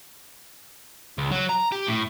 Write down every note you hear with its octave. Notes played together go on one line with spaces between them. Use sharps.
C#2
F#3
A#5
G4
A2